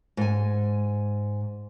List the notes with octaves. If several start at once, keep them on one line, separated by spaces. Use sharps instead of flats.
G#2 G#5